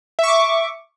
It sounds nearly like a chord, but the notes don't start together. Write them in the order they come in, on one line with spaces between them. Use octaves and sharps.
E5 C#6 D6